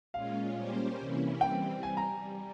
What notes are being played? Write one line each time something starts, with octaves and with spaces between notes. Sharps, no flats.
A#2 G#3 C#4 F4 F5
G3 A#3 C#4 G4 C5
C3 E3 A#3 C#4 E4
E3 G3 C4 G5
G3 G#5
A#5